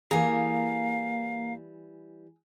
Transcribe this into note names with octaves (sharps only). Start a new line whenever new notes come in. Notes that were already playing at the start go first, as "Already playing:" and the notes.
E3 G3 A#3 G#4 F5 A#5